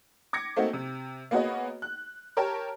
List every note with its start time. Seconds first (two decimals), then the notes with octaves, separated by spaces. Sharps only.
0.33 D6 G#6 A#6 C#7
0.56 A3 A#3 C4 D#4 F#4
0.73 C3
1.31 A#3 B3 F#4 G#4 C#5 D#5
1.82 F#6
2.37 G4 A#4 C#5 G5 A5